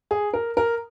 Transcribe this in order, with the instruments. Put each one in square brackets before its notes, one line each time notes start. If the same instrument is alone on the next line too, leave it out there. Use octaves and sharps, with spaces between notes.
[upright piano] G#4
A#4
A#4